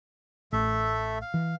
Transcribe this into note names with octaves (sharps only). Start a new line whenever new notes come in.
A1 A3 A4 E5
F5
E3